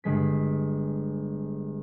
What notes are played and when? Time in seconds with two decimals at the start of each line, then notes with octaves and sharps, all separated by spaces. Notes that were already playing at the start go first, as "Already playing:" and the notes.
0.04 G1 G#3 B6